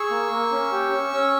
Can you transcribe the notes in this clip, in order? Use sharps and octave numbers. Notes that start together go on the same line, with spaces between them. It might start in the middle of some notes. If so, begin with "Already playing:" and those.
Already playing: G#4 C#6 E6
A#3
A#3
C#4
G4
C#4
C#4